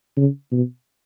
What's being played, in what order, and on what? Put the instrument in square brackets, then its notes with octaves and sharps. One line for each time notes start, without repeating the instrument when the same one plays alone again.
[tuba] C#3
B2